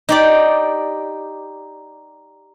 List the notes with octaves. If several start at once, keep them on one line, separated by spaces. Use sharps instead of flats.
D#4 G4 D5